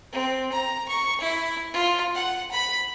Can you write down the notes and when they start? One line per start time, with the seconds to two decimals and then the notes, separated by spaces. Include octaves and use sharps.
0.13 C4
0.52 A#5
0.88 C#6
1.21 E4
1.73 F4
2.15 F#5
2.52 B5